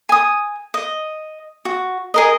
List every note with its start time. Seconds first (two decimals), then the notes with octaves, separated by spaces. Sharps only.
0.09 G#5 D#6
0.74 D#5
1.65 F#4
2.14 G#4 A#4 D#5